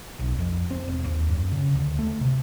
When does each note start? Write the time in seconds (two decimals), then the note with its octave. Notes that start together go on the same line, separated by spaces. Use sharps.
0.20 B1
0.39 F2
0.71 C4
0.88 E1
1.06 D#2
1.29 F#2
1.52 C#3
1.75 D2
1.99 A3
2.21 C3